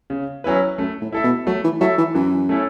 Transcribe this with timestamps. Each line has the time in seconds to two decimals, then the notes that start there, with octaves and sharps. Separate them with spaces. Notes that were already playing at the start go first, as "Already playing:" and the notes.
0.10 C#3
0.44 F#3 C#4 E4 B4
0.78 F#2 A3
1.01 A2
1.12 E4 A4 E5
1.24 B2
1.47 F#3 A3
1.64 E3
1.81 F#3 E4 A4 E5
1.98 E3
2.15 F#2 E3
2.49 A3 C#4 E4 A4